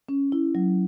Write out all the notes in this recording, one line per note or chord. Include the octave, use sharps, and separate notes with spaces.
C#4
E4
F#3